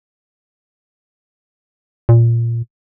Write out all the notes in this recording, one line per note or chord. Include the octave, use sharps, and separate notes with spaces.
A#2